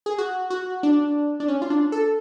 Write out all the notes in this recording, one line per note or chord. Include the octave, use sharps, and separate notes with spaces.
G#4
F#4
F#4
D4
D4
C#4
F4
D4
A4